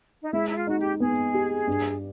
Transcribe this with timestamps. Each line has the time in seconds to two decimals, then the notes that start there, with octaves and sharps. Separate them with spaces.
0.23 D#4
0.33 G#3 E4
0.49 E4
0.56 F4
0.67 D#4 F#4
0.78 G4
1.00 B3 G#4
1.34 G4
1.67 G2